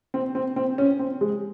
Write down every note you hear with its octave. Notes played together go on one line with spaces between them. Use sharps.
C4
C4
C4
C#4
C4
G#3